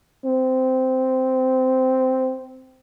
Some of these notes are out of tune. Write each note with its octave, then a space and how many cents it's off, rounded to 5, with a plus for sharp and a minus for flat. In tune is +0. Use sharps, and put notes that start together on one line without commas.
C4 -10